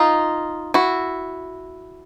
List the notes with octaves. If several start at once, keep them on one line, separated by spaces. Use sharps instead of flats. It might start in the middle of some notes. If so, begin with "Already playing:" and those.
Already playing: D#4 F4
E4 F#4